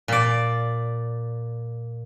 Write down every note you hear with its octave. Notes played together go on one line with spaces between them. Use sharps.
A#2 D5